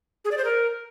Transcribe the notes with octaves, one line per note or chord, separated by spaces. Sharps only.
G#4
D5
C5
A#4